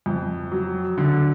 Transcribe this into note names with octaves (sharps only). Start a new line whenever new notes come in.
F2
F#3
D3